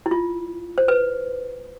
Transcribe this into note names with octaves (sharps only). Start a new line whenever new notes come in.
E4
F4
C5
B4